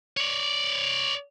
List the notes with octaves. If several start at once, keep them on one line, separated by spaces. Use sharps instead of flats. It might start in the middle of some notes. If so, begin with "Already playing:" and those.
C#5 D5